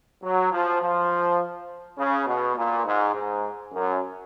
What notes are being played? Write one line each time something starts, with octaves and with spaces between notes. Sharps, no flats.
F#3
F3
F3
C#3
B2
A#2
G#2
G#2
F#2